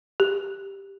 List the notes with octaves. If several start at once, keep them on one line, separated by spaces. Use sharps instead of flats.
G4